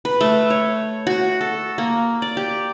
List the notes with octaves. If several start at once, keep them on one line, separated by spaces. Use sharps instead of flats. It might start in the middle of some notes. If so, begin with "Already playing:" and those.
B4
A3
C#5
F#4
A4
A#3
D5
G4